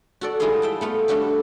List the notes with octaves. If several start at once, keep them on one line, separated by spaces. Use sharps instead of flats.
F#4 A4 D5
G3 G#3 E4 F4 G#4 C6
E5 G5 A5
A3 B3 F4
G3 A3 D4 F#4 G4